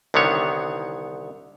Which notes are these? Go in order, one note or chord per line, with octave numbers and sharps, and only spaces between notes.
C2 D3 D#3 B3 C#5